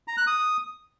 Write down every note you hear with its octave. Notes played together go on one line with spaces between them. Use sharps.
A#5
F#6
D#6